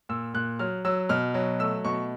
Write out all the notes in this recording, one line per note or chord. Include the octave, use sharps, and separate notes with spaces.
A#2 E6
A#2 F#6
F#3 F6
F#3 E6
B2 F6
F#3
A3 E6
B2 C#6